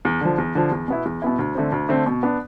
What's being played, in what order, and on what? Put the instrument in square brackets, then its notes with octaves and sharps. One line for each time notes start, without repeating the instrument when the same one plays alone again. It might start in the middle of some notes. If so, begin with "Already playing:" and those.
[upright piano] E2
D3 F3
E2
D3 F3
E2
B2 B3 E4
E2
B2 B3 E4
D2
D3 A3 C4
D2
D3 A3 C4
B2
B3 D4